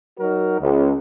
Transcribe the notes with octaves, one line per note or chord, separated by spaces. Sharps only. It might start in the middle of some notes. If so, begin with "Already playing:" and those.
F#3 D#4 F#4 A#4
C#2